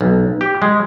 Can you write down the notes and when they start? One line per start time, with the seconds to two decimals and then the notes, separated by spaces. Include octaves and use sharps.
0.01 B1
0.41 G4
0.62 G#3